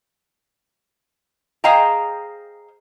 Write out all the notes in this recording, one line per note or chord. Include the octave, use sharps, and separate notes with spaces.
G#4 C5 D#5 F5 G5 A#5